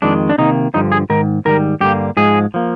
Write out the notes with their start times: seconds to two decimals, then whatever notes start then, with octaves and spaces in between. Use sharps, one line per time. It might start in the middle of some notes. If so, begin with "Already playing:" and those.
0.02 F2 D#3 G#3 D4
0.29 D4
0.38 C3 D#3 A#3 D#4
0.74 G2 D3 F3 D#4
0.92 G#4
1.10 G#2 D#3 A#4
1.45 G#2 D#3 G3 A#4
1.80 G2 D3 G3 A#3 G4
2.17 G#2 F3 G#3 G#4
2.54 F3 A#3